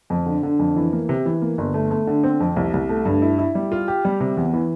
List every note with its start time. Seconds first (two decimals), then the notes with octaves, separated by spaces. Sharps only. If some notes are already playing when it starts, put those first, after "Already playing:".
0.10 F2
0.26 D3
0.43 D3
0.59 F2
0.76 E3
0.93 A#3
1.09 C3
1.26 E3
1.42 A#3
1.58 G1
1.74 A3
1.91 A3
2.07 D3
2.24 C4
2.40 F2
2.56 C2
2.73 C2
2.89 A3
3.05 G2
3.22 E4
3.39 E4
3.55 G3
3.72 F4
3.88 G4
4.05 G3
4.20 C3
4.37 E2
4.53 E3